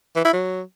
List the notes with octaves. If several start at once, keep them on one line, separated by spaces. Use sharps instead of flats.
E3
E4
F#3